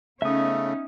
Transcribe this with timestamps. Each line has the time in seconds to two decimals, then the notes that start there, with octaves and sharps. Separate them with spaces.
0.22 C#3 A3 B3 C#4 D#4 E5 D#6